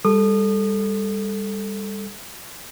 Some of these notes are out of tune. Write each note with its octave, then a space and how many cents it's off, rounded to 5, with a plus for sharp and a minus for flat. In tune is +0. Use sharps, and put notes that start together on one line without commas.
G3 +30 A4 +0 D#6 -30